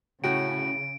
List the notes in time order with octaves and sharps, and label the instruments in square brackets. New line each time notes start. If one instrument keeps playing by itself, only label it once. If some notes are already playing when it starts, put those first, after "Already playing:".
[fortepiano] A2 F#4 G5 [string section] C#3 [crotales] D7